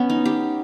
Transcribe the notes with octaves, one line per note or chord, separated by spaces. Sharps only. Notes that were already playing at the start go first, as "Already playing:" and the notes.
Already playing: B3 C#4
D#4
G4